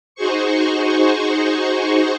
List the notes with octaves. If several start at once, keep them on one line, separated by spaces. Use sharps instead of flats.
D#4 F#4 G#4 C5 C#6